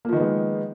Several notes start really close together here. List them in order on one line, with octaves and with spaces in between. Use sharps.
A#3 F3 D#3 B3 G#3